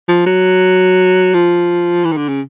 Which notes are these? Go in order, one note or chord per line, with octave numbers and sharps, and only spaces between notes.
F3
F#3
F3
E3
D#3
D3
C#3